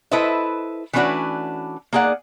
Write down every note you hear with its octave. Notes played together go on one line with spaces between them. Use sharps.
E4 A4 B4 C5 D#5 E5
E3 A3 C#4 D4 F#4 B4
A#3 D#4 G#4 D5 F#5